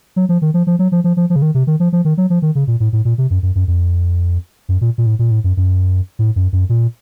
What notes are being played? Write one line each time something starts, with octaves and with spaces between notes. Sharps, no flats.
F#3
F3
D#3
F3
F3
F#3
F3
F3
F3
F3
C#3
D#3
C3
D#3
F3
F3
D#3
F#3
F3
D#3
C#3
A#2
A2
A2
A#2
C3
F#2
F#2
F#2
F2
F#2
A#2
A#2
A2
A#2
A2
F#2
F#2
A2
F#2
F#2
A#2